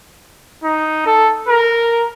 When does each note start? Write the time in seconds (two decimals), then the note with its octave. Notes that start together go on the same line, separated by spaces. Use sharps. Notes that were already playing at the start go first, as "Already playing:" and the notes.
0.64 D#4
1.06 A4
1.48 A#4